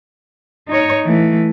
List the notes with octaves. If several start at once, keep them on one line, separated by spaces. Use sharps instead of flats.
D#4 C#5
E3 A3